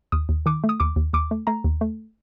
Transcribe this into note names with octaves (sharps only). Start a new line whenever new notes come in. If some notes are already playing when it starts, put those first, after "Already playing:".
D#2 D#6
D#2
D#3 D6
A3
D#6
D#2 D6
D#2
D#2 D6
A3
A3 A#5
D#2
A3